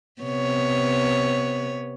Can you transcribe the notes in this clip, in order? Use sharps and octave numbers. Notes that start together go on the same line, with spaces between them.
C3 B3 C#5